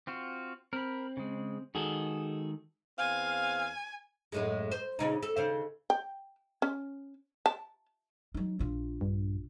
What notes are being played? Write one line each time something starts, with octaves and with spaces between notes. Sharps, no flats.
C4 F4 F#4
C4 A#4 B5
C#3 G#3
D#3 G#3 F#4 G#4 A4
E2 C4 F5 G#5
F#2 A2 G#3
C5
A#2 C#3 D#4
A4
D#2 C#3 C5
G5
C#4
A5
F#3 D#4
A#1 F4
G2